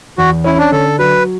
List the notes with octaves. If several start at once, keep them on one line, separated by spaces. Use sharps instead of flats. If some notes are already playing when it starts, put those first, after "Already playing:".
E2 F#4
C#4 E4
D4
D3 A4
F#3 B4